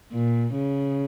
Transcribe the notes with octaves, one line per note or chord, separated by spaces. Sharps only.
A#2
C#3